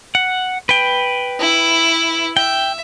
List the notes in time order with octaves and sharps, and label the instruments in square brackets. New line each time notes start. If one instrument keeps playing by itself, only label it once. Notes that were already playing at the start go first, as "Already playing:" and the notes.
[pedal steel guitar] F#5
B4 G5
[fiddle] E4
[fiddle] E5 [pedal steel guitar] G5